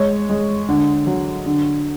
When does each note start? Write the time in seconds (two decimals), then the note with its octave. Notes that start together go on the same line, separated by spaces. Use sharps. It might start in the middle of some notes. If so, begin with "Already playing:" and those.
Already playing: G#3 C#5
0.30 G#3
0.69 D3
1.07 F#3
1.46 D3